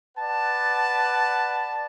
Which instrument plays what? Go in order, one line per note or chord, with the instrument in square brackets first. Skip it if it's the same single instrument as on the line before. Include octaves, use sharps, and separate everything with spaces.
[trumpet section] B4 D5 F#5 A5